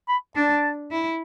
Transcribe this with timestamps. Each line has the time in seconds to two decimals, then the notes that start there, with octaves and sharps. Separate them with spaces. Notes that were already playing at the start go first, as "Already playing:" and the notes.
0.08 B5
0.36 D4 A5
0.91 E4